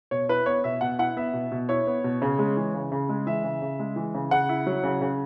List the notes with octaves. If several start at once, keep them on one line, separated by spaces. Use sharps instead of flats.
B2 C#5
E4 B4
B3 C#5
B2 E5
B2 F#5
E4 F#5
B3 E5
B2
B2
E4 C#5
B3
B2
C#3
G#3
E3
C#3
C#3
G#3
E3 E5
C#3
C#3
G#3
E3
C#3
C#3 F#5
E4
F#3
C#3
C#3